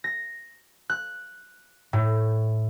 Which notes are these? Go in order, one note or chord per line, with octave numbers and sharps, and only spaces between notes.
A#6
F#6
A2